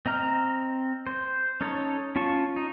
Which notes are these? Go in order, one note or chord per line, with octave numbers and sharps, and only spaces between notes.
C4 D#5 A#5 F6
C5
C#4 D#4 A4 C#5
C#4 F4 A5 C#6
D#4